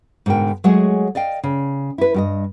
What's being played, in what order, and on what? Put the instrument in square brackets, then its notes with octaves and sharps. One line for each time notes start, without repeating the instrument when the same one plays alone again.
[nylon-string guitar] G#2 B2 D3 A#4 G5
F#3 G#3 A3 G#4 C#5 F#5
D5 D#5 F5 G5
C#3
E4 B4
G2 G4 D#5